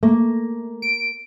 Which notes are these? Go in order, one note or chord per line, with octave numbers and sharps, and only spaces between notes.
A3 A#3
D7